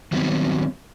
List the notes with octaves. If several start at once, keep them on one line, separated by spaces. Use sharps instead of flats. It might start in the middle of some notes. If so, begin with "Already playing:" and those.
D#3 F#3 G3 B3 C4